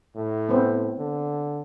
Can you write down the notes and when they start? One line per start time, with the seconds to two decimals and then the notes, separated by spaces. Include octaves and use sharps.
0.16 A2
0.49 B3 C4
0.98 D3